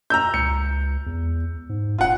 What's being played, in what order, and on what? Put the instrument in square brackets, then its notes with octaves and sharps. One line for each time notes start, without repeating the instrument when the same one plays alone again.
[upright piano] A#5 E6 G6
[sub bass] C#2 [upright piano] C#7
[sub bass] E2
G#2
[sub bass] E1 [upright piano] F4 F#5